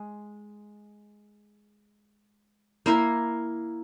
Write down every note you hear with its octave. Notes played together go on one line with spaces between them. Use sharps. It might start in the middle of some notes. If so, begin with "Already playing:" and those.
Already playing: G#3
A#3 E4 A#4